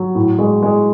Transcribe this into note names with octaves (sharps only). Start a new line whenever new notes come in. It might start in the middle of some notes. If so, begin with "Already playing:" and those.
Already playing: F#3
A2
G#3
G#3